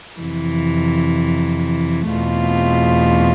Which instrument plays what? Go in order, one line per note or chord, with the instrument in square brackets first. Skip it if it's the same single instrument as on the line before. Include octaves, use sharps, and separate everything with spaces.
[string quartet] F2 C3 E3
E2 B2 A3 C4 F4